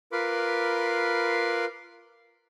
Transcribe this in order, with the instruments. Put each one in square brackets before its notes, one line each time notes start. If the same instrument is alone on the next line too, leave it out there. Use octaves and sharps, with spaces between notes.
[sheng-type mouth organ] F4 A#4 B4 B5 C6 D6